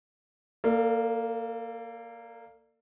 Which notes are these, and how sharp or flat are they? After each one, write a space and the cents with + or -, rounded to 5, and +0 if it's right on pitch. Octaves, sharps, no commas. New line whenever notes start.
A#3 -5 A4 +35 D5 +25